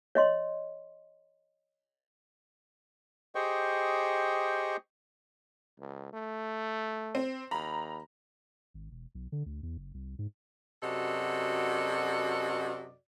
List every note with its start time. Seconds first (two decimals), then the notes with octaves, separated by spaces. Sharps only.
0.15 C#5 D#5 C6
3.35 G4 G#4 C5 D#5 G5 C#6
5.79 C#2
6.13 A3
7.15 C4
7.51 D#2 A#5 B5
8.74 G#1
8.91 E1
9.15 B1
9.32 D3
9.46 D2
9.63 E2
9.77 F#1
9.94 C2
10.19 G#2
10.83 F#2 C3 F#4 A4 D5 D#5